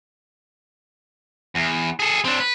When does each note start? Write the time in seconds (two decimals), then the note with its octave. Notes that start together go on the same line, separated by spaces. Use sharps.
1.55 E2
2.00 G#4 A4
2.25 C4 D4
2.40 B4